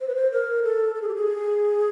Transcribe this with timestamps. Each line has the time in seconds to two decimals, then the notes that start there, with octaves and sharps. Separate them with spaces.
0.01 C5
0.08 B4
0.15 C5
0.32 A#4
0.63 A4
0.95 A4
1.02 G#4
1.09 G4
1.15 G#4